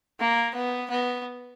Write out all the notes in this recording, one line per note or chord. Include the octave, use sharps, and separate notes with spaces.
A#3
B3
B3